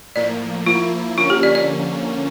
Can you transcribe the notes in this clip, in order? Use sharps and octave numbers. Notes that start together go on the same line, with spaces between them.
A2 F3 A#3 D5
F3 A#3 E4 F4
D3 F3 A#3 C#4 F4
G4
D5
D5